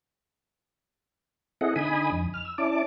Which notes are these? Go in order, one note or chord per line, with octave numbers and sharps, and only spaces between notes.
C4 E4 G#4 A4 D#5 F#5
D3 D#4 G#5 B5 D#6
F2
F6
E6
C#4 E4 D5 A5 D6